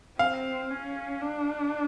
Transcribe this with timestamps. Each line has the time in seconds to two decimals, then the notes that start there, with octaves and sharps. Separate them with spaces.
0.19 C4 F5
0.70 C#4
1.21 D4